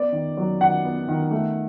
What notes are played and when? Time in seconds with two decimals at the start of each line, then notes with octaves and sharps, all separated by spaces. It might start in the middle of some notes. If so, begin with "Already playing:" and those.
Already playing: B3 D5
0.12 D#3
0.37 F#3
0.61 D#3 F#5
0.84 B3
1.08 D#3
1.31 A3